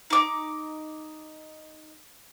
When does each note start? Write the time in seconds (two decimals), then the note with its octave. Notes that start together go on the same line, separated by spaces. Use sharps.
0.10 D#4 D6